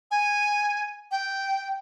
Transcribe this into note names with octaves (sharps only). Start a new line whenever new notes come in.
G#5
G5